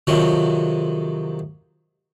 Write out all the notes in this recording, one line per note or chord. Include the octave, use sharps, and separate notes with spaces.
F2 C3 D#3 F#3